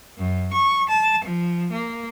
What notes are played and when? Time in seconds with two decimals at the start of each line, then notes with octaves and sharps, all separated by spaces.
0.18 F#2
0.52 C#6
0.89 A5
1.24 F3
1.72 A#3